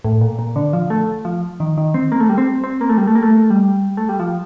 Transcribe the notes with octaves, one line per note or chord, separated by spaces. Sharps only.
A2
A#2
A#2
D3
F3
A3
F3
D#3
D#3
C4
A#3
A3
G3
C4
C4
A#3
A3
G3
A3
A#3
A3
G3
A3
G3
F3